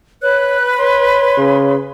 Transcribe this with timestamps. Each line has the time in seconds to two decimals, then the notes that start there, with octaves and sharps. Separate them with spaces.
0.22 B4 C#5 F#6
0.78 C#5 C6
1.38 C#3